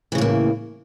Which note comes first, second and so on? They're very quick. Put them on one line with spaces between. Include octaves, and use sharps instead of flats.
E3 C#3 A2 A#3